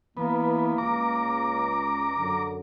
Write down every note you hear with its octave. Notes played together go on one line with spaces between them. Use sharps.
E3 A#3 B3
C#2 A#5 D6
F#2 D3